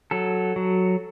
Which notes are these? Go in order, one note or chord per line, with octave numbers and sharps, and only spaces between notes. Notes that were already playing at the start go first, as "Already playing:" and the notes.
F#3 A4
F#3